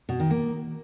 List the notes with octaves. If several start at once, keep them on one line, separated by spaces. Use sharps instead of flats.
B2
D#3
A#3